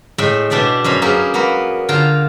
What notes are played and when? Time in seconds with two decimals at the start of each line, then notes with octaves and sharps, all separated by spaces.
0.18 A2 G#3 E5 G5
0.50 B2 D4 G4 D5 E5
0.84 F#2 C#4 C5 B5
1.02 F#3 A#3 B3 G4 G#4
1.34 A#3 B3 F#4 B4
1.89 D3 F4 G5 A#5